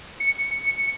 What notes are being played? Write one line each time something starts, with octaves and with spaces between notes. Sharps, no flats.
C#7